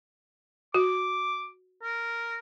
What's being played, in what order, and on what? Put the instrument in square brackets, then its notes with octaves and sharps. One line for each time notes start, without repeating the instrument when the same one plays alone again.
[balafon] F#4 [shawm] D6
[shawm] A#4